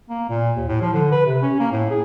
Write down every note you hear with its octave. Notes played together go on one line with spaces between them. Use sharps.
A#3
A#2
D#2
A2
F3
D3
B4
C3
C#4
A#3
A2
G#4